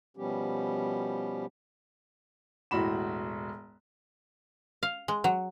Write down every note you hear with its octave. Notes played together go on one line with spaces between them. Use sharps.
B2 F3 G3 B3 C#4 G4
E1 A2 F#4 B5 E7
F5
G#3
F#3